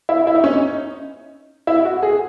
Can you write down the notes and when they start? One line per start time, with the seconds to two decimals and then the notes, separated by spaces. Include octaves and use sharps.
0.09 E4
0.27 E4
0.35 D#4
0.44 C#4
0.52 D#4
1.67 E4
1.85 F#4
2.03 G#4